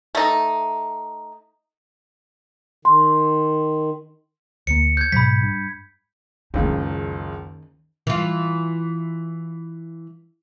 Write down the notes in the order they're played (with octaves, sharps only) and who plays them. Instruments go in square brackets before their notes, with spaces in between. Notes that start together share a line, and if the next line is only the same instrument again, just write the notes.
[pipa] A3 D#4
[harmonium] D#3 [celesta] C6
[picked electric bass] D2 A#3 [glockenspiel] C#7
[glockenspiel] G6 G#6
[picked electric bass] G#2 B2 F#3 [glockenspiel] B5 B6
[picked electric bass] G2
[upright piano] F#1 C#2 [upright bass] D#3 D#4
[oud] E3 F4